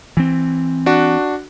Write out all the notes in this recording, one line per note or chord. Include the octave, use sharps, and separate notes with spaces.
E3 C4
D4 F#4